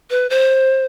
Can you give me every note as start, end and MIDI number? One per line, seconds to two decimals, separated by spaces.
0.10 0.29 71
0.30 0.85 72